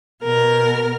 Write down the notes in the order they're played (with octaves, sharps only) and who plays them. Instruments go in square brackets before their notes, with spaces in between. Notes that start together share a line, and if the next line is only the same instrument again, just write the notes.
[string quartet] B2 A#4 F6